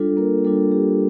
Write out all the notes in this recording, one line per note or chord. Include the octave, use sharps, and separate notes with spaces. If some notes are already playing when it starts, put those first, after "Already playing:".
Already playing: G3 D4 F4 A4
A#3 A#4
G3 D4 F4 A4
G4